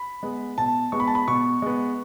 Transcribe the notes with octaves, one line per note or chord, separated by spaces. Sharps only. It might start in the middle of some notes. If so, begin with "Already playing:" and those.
Already playing: B5
G#3 B3
B2 A5
G#3 B3 C#6
B5
A5
B5
B2 C#6
G#3 B3